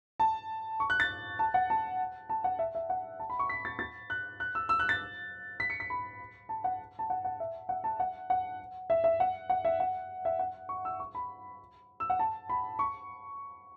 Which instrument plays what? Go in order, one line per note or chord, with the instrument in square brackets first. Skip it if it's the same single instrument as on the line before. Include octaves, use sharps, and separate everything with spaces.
[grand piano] A5
C#6
F#6
A6
A5
F#5
A5
A5
F#5
E5
E5
F#5
A5
B5
C#6
B6
A6
A6
F#6
F#6
E6
E6
F#6
A6
B6
C#7
B6
B5
A5
F#5
A5
F#5
F#5
E5
F#5
A5
F#5
F#5
E5
E5
F#5
F#5
E5
F#5
E5
F#5
C#6
E6
C#6
B5
E6
F#5
A5
B5
C#6